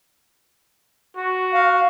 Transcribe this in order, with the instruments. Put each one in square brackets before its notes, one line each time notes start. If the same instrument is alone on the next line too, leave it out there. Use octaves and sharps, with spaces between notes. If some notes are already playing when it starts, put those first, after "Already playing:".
[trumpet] F#4
[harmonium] F5